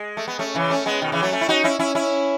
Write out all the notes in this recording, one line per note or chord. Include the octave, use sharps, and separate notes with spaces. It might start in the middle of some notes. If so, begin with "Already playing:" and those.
Already playing: G#3
A3
B3
A3 C#4
C#3 E3
A3 C#4
G#3 B3
B2 D#3
C#3 E3
F#3 A3
A3 C#4
E4
D#4 F#4
C#4 E4
C#4 E4
C#4 E4